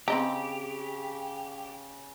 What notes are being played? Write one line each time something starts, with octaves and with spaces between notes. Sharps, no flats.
C#3 C4 G4 D#5 A#5